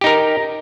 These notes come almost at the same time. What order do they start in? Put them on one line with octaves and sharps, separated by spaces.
G4 D#4 A#4